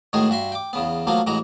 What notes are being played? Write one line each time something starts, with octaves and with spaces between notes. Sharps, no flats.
A2 D#3 G#3 A3 F#4 G#4
G2 F#4 E5 C6
G5 D6
E2 C#3 B3
F3 F#3 A3 A#3 F#4
A1 E3 G#3 F#4 A#5